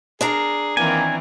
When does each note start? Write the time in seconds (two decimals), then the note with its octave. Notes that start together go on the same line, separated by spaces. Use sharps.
0.21 D4 G#4 A#4 A#5
0.77 D#3 E3 A#3 C4 G#5